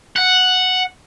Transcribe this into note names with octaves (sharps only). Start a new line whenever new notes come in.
F#5